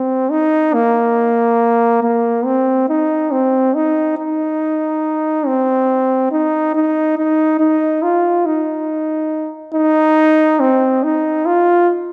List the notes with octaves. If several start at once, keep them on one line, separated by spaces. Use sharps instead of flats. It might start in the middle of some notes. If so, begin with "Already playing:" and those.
Already playing: C4
D#4
A#3
A#3
C4
D#4
C4
D#4
D#4
C4
D#4
D#4
D#4
D#4
F4
D#4
D#4
C4
D#4
F4